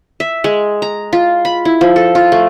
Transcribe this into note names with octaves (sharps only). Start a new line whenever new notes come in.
E5
G#3
A#5
F4
B5
E4
F3
A4
F4
A3